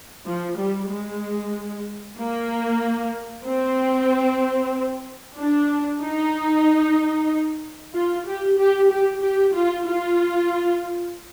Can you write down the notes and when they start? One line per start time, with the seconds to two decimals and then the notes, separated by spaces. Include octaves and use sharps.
0.26 F3
0.57 G3
0.90 G#3
2.18 A#3
3.47 C4
5.38 D4
6.02 D#4
7.94 F4
8.27 G4
8.58 G4
8.91 G4
9.22 G4
9.55 F4
9.87 F4